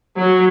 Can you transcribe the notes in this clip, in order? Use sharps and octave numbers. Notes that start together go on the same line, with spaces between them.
F#3